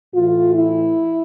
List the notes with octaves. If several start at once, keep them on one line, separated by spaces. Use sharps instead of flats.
A2 E3 F4
E4